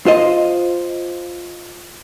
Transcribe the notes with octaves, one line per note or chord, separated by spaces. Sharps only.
F4 C5 D#5